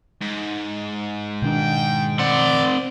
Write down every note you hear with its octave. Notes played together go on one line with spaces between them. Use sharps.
G#2
B2 D#3 D4 G5
C4 D5 F#5 C6